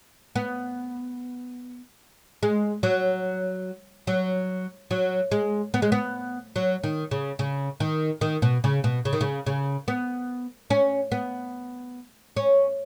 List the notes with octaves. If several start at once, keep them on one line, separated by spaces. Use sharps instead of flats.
B3
G#3
F#3
F#3
F#3
G#3
B3
G#3
B3
F#3
D#3
C#3
C#3
D#3
D#3
B2
C#3
B2
C#3
D#3
C#3
C#3
B3
C#4
B3
C#4